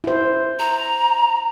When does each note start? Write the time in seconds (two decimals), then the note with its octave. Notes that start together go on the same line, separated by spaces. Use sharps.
0.04 E4 C5
0.59 A#5